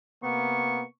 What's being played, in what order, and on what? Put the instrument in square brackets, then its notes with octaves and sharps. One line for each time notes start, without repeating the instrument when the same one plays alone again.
[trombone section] C3 A#3 B3 [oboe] C#6